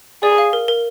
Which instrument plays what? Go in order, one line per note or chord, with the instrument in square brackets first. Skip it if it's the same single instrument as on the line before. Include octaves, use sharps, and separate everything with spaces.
[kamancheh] G#4 [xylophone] D5
[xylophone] F5
A#4
A#4